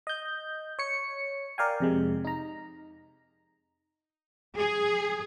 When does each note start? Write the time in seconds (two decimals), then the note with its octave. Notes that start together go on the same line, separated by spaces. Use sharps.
0.07 D#5 G6
0.79 C#5 C#7
1.58 A#4 D5 F5 G5 G#5
1.80 F2 C3 G#3
2.25 D#4 A#5
4.57 G#4